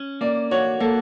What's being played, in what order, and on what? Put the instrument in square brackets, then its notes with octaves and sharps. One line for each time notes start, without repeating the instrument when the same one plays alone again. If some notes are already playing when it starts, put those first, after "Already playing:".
Already playing: [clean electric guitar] C#4
[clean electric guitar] A#3 [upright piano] D5
[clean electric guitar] F#4 [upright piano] C#5
[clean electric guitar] A#3 [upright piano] A4